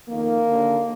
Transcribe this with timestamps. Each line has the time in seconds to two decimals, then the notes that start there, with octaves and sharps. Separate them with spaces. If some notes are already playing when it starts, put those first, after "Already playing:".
0.09 F2 D#3 A#3
0.48 D#2 D3